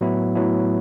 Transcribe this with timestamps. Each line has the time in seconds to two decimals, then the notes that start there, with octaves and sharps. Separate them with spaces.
0.01 A2 F#3 B3 E4
0.35 A2 F#3 B3 E4